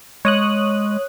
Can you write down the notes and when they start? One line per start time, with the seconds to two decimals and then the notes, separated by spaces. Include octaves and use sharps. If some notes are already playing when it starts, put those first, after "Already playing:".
0.25 G#3 C#5 D#6 F#6